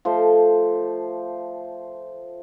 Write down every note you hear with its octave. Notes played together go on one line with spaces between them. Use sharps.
F3 A3 C5 F5